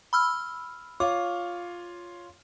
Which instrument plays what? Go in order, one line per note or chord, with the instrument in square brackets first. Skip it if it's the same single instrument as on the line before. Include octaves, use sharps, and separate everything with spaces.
[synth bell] B5 E6 F6
[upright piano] F4 C#5 F5 [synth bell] D6